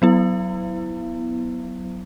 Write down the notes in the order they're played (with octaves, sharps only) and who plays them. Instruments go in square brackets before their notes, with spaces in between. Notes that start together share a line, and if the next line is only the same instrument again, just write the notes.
[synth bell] F#3 B3 E4